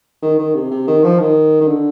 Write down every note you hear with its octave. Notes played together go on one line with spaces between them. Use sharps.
D#3
D#3
C3
C3
D#3
F3
D#3
D#3
D3